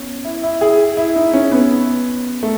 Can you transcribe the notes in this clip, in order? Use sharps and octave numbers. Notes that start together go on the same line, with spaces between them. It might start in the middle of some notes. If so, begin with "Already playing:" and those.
Already playing: B3 C#4
E4
E4
G#4
E4
D#4
C#4
B3
A3